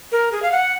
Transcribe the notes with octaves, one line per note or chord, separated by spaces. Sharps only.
A#4
G#4
F5
F#5